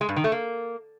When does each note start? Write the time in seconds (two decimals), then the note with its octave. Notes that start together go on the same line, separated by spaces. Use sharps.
0.01 G#3
0.09 G2
0.16 D#3
0.24 A3
0.32 A#3